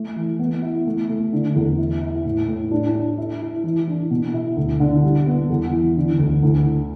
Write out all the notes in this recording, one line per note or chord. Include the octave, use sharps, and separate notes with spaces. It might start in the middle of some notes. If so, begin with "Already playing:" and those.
Already playing: A3
E3
B3
E4
A3
A3
D3
E2
E4
E4
A2
A2
D4
D4
E4
E4
E3
D4
B2
E4
D2
D3
G3
B3
E2
E3
D3
D2
D2
D3